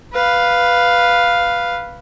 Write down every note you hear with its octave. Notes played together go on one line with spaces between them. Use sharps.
B4 F5